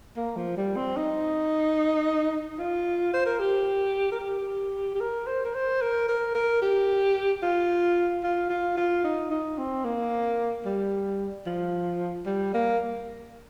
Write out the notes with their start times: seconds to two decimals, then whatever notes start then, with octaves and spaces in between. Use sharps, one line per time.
0.16 A#3
0.36 F3
0.56 G3
0.76 C4
0.97 D#4
2.58 F4
3.13 C5
3.26 A#4
3.40 G4
4.12 A#4
4.20 G4
4.95 G4
5.00 A#4
5.27 C5
5.45 A#4
5.55 C5
5.81 A#4
6.08 A#4
6.35 A#4
6.62 G4
7.42 F4
8.23 F4
8.49 F4
8.77 F4
9.04 D#4
9.30 D#4
9.58 C4
9.84 A#3
10.65 G3
11.46 F3
12.26 G3
12.54 A#3